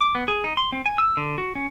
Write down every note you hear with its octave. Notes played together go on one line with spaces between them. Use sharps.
D6
B3
G#4
D#4
C6
C4
G#5
E6
D3
F#4
C#4